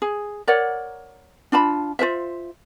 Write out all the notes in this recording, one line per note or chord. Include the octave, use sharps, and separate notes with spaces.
G#4
A#4 C#5 D5 F#5
D4 F4 A5 B5
F4 A#4 C5 E5